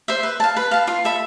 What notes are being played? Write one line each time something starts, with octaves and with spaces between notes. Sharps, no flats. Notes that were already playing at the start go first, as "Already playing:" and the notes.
C5 E5
B4
F5 A5
B4
F5 A5
F4
A4 E5 B5